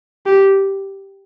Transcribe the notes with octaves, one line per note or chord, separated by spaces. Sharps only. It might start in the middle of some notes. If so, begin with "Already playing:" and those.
G4